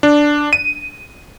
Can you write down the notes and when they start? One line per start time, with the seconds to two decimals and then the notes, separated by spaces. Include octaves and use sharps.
0.03 D4
0.53 D#7